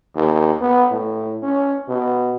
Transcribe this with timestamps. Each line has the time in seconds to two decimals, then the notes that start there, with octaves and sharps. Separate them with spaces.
0.15 D#2
0.61 B3
0.91 A2
1.42 C#4
1.88 B2